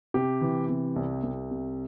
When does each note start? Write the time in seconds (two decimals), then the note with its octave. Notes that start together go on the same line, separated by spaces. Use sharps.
0.14 C3 G4
0.41 E3
0.69 C3
0.96 C2
1.23 C2
1.51 C3